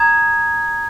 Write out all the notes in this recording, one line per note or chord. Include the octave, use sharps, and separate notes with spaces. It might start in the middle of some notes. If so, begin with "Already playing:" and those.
Already playing: A#5 D#6 G#6